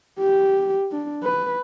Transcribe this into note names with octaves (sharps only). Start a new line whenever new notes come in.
G4
D4
B4